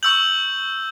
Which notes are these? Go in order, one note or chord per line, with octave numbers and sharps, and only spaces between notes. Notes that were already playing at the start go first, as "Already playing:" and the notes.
C#6 E6 G6 F#7